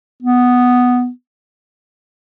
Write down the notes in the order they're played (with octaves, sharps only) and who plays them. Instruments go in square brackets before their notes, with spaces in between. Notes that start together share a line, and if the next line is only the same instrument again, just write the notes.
[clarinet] B3